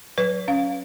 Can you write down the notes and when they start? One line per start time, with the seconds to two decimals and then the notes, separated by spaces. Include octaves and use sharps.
0.18 F#3 B4
0.48 C#4 F5